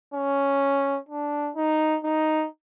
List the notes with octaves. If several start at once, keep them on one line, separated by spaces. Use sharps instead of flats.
C#4
D4
D#4
D#4